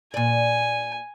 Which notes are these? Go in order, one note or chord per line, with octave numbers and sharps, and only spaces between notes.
A#2 D5 G#5